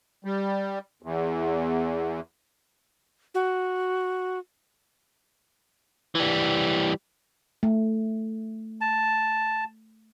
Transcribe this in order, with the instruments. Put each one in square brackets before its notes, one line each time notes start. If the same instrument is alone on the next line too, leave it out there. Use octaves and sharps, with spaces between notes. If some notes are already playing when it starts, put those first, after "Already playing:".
[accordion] G3
E2
[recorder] F#4
[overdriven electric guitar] E3 G3
[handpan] A3
[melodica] A5